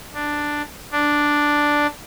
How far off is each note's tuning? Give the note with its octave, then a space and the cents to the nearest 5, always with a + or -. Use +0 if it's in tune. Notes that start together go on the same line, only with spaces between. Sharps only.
D4 +5
D4 +0